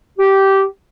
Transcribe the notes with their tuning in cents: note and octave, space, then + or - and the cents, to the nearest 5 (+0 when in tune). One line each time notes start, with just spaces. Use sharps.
G4 -15